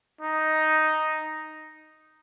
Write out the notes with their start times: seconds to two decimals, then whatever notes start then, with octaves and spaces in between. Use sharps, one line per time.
0.21 D#4